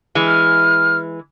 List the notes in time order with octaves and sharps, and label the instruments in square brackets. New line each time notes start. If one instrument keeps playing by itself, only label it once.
[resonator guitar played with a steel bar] E3 G#3
[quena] F6